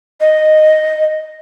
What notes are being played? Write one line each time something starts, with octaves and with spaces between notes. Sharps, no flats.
D#5